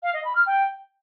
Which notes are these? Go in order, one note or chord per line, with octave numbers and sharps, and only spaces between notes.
F5
D#5
B5
F6
G5